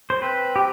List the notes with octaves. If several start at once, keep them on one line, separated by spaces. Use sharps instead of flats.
C5
C4 B4
G4